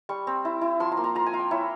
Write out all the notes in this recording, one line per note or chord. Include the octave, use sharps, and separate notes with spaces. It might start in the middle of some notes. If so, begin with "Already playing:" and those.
G3 C#6
C4
E4
E4
F3 C6
A#5
A#3
A#5
F4 A#5
G#5
F4
G5
E4 C#5